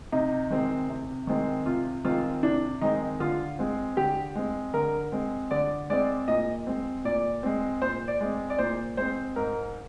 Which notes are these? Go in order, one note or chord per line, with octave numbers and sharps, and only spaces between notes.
C3 D#4
D#3 G#3 C4
C3
D#3 G#3 C4
C3 F4
D#3 G#3 C4 F4
C3 D4
D#3 G#3 C4 D#4
D3 F4
G#3 C4
D3 G4
G#3 C4
D3 A#4
G#3 C4
D3 D5
G#3 C4 D5
A#2 D#5
G#3 C4
A#2 D5
G#3 C4
A#2 C5
D5
G#3 C4
D5
A#2 C5
G#3 C4 C5
G#2 A#4